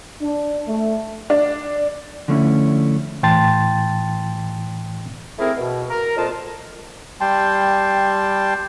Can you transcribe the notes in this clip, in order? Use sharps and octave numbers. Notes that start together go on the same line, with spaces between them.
D4
A3
D4
D3 F3 A3 C#4 E4
A2 E3 G5 A5 C6 A6
C3 A3 C4 E4 G#4 A#4
B2
A#4
F2 A#2 F4 D#5 A5
G3 G5 A5 C6